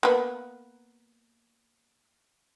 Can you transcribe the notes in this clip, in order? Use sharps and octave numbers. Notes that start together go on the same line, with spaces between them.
A#3 B3